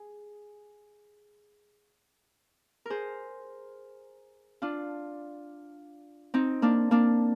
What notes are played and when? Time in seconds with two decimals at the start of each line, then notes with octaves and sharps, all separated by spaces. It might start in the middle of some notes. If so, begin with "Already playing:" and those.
Already playing: G#4
2.86 G#4 A#4 C5
4.62 D4 F4
6.34 C4 D#4
6.62 A#3 D4
6.91 A#3 D4